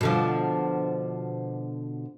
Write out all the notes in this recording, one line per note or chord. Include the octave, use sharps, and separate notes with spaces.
B2 D3 F3